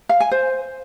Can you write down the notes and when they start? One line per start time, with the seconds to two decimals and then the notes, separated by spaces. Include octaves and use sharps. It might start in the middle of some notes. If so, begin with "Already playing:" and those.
0.09 F5
0.20 G#5
0.31 C5